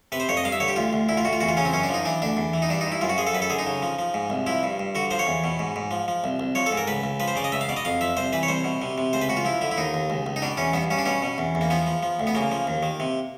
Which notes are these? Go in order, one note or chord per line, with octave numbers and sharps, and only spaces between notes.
C3 B4
C5
F2 C#5
D#5
G2 F5
E5
D3 C#5
G4
D2 F4
D2
D2 E4
F4
D2 F#4
F4
E2 F#4
F4
C#3 C#4
C4
F#2 C#4
D4
F3
D#4
E3 D4
D2 D4
E2
E3
D#4
G2 D4
D#4
G2
E4
F#2 F4
F#4
F3 G#4
A4
F#2 B4
A4
D3 G#4
D#4
C#3
F3
F3
G#2
C2
F3 E4
G2
G2
D3 F#4
F3 C5
C#5
E2
B2
G#2
G#2
F3
F3
C2
C2
F3 C#5
A4
G#2
A#4
C#2 B4
C#2
F3 B4
C5
C#3 D5
D#5
C#2 E5
F5
B2 D5
D#5
F2 F5
F3 E5
C2 C5
E3 B4
C#5
C2 C5
B2
C3
C3
C#2 C5
B4
C#2 F#4
F4
F3 E4
D3 E4
E4
D#2 D#4
D#2
C#2
C#2
D#4
B2 D4
E2 C#4
G2 B3
G2 C#4
D4
B2 C#4
B2
E2
E2
A#3
F3 B3
F3
F3
D2
B3
C#3 A#3
F3
D#2
D#3
C3